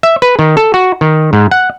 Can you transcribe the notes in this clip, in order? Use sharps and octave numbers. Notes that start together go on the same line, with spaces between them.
E5
B4
D#3
A4
F#4
D#3
G#2
F#5